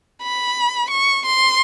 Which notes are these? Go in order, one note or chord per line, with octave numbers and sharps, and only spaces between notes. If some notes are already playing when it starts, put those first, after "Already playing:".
B5
C#6
C6